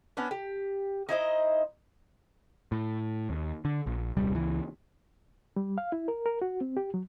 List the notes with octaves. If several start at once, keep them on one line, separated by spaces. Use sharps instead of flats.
B3 C#4 D4
G4
D#4 E4 C5 D#5
A2
D#2
D3
A#1
D#1 C2 G3
C#2 E3
G3
F5
E4
A#4
A#4
F#4
C4
G4
F#3